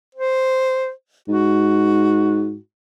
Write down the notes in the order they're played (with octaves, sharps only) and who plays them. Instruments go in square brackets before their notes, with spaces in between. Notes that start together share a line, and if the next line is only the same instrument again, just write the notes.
[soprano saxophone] C5
[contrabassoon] G#2 [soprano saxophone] F#4